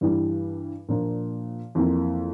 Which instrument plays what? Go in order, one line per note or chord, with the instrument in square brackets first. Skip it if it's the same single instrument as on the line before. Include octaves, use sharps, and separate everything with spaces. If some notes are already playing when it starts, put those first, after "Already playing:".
[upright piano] G2 E3 G3
A#2 F3 A#3 D4
F2 E3 A#3 E4